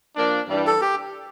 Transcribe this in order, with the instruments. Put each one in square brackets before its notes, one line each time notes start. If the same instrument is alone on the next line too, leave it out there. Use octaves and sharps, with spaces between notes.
[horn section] F3 A#3 D4
G2 E3 G3 D4
[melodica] A4
G4